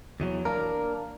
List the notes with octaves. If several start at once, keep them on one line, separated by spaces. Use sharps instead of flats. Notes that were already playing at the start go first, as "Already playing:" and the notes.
E2 E3 F#3
A#3 D4 A#4